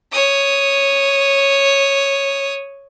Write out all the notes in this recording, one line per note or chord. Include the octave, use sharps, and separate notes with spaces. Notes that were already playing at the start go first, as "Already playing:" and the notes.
C#5 D#6